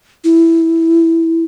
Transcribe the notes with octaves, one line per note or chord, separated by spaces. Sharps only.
E4